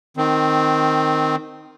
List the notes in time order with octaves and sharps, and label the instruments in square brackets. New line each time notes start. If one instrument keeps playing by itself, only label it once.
[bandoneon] D#3 C4